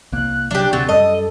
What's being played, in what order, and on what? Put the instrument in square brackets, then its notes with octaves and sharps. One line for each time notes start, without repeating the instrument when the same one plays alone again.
[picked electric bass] C2 A#3 [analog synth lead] F#6
[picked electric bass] C3 F#3 [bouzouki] D4 G4
[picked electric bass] D2 C3 C4 [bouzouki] F#3 [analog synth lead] A6
[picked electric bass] F#2 G3 [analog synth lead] A4 [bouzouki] D#5